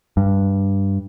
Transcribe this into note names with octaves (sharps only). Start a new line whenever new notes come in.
G2